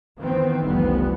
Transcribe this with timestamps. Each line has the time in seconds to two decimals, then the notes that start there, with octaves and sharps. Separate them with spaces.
0.18 D#3 E3 B3 C4
0.62 F1 C2 E3 B3